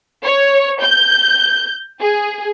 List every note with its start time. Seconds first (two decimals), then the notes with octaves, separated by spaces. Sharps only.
0.23 C#5
0.80 G6
2.00 G#4